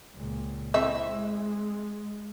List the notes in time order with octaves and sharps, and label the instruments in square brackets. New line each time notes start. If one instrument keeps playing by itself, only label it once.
[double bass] C#2 A#2
[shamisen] C4 E5 [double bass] E4
[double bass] G#3